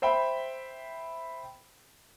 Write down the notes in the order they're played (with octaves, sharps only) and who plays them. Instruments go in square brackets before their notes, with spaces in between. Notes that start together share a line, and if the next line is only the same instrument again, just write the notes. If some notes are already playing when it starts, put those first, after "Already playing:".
[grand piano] C5 E5 G5 B5